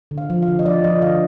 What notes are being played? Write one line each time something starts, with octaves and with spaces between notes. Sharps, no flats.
D3
F5
F3
F5
D3
D#5
F3 D5
F3 D#5
D3 F5